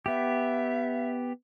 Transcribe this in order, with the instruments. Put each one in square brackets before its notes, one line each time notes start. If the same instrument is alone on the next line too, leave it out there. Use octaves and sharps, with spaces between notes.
[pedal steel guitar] B3 G4 [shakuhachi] E5